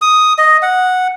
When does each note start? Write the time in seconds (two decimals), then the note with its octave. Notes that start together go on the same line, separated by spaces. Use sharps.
0.02 D#6
0.38 D#5
0.62 F#5